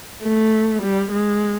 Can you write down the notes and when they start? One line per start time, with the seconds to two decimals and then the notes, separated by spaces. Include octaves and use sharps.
0.23 A3
0.82 G3
1.12 G#3